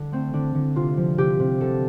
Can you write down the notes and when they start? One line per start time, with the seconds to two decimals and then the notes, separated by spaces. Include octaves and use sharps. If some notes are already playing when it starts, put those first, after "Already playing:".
Already playing: D3
0.12 A3 C4
0.34 D3 D4
0.55 D3
0.76 C3 F4
0.97 F3
1.18 C3 G4
1.40 C3
1.60 D3 A4